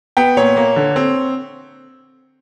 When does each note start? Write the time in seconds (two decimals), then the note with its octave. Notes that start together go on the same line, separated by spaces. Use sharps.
0.17 B3 G5
0.37 A#2 C#5
0.57 A#3
0.76 D3
0.96 C4